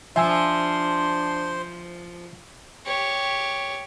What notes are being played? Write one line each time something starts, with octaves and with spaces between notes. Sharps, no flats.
F3 D4 C5 E5 G#5 C6 E6
G4 C#5